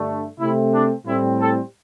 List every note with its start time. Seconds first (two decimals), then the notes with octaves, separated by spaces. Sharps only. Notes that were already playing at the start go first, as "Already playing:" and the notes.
Already playing: G2 D3 A3
0.40 C3 A3 C4 E4
0.73 D4
1.06 A2 G3 C4 E4
1.40 A4